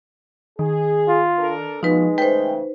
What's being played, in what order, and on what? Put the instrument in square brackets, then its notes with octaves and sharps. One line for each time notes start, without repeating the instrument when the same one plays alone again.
[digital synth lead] D#3 [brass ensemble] G#4
[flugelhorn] F4
[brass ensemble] D4 A4 A#4
[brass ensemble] B2 [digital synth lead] F3 [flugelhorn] G#3 [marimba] D#4 B4
[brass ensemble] C#3 E3 A3 [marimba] B4 C5 [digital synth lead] G5